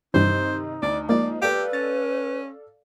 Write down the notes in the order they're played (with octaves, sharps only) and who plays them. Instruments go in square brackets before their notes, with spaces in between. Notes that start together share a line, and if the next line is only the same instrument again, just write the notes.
[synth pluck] G2 E3 [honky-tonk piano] C3 D#3 [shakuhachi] D#4 [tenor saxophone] C5
[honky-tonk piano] D2 [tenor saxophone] D5
[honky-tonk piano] F3 G#3 [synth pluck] A#3 [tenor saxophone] D5
[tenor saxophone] G4 [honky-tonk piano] A4 D5 F5 [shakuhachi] B4
[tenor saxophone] C#4 [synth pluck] A6